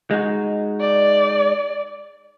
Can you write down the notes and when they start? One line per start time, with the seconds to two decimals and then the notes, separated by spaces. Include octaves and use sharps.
0.11 G#3 D#4 F#4
0.81 D5